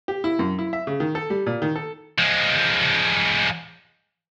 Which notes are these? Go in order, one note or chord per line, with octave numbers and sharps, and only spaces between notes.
G4
E4
F#2
E4
E5
C#3
D#3
A4
G3
A#2
D#3
A4
F3 G#3